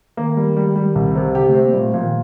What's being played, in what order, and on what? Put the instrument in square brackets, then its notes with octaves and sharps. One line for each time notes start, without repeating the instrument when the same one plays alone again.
[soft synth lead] D#3 [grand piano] A#3
[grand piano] G3
G3
G3
C2
C3
[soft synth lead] D3 [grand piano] G4
[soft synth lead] A3 [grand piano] C4
[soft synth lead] A#3
[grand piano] A#2 [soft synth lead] G3
[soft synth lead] A3
[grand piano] A#2 [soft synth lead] F3
[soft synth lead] D#3